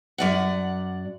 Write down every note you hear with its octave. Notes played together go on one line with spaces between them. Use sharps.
F#2 D5 F#5